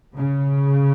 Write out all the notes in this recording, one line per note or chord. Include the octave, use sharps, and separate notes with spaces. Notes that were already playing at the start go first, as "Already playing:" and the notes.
C#3